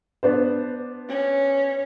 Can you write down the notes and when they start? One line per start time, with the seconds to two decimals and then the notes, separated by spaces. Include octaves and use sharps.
0.23 B3 D4 C5
1.09 C#4